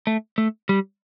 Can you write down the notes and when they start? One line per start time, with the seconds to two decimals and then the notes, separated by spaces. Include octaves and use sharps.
0.07 A3
0.38 A3
0.69 G3